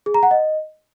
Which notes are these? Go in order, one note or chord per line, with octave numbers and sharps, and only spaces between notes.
G#4
A#5
F#5
D#5